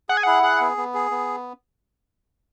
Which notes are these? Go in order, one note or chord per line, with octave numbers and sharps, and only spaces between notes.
G#4 F#5
G#5
E4 F#5
G#4
B3
B3
G#4
B3